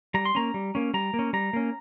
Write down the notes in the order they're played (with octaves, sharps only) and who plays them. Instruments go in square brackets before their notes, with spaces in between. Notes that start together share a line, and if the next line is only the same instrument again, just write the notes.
[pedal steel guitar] G3 A#5
C6
A#3 C#4 A#5
G3
A#3 C#4
G3 A#5
A#3
C#4
G3 A#5
A#3 C#4